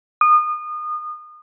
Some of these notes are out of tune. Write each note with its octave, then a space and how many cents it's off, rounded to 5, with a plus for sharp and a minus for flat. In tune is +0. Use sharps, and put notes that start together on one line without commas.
D#6 -30